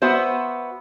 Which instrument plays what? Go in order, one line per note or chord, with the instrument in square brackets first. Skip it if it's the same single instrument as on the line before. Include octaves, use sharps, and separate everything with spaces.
[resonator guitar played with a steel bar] B3 F#4 C5 E5